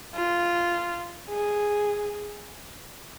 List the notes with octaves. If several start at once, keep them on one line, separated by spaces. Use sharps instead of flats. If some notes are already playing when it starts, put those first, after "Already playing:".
F4
G#4